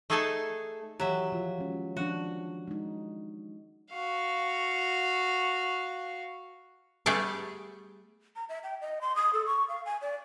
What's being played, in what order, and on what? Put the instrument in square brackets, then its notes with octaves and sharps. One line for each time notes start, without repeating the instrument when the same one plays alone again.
[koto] A3 D#4 G#4 A4 G#5 A5
[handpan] D#3 E3 G4 [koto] F#3 E5
[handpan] F3 F4
G#3 C#4
[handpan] D#3 F3 D4 [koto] F#4
[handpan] G#3 D#4
[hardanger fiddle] F#4 F5
[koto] G3 A3 B3 G#4 D5 E5
[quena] A#5
E5
G5
D#5
C6
D#6
A4
C#6
F5
G#5
D5